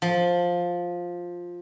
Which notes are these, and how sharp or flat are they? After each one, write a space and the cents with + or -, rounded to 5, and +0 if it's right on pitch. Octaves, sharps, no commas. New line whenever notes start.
F3 +10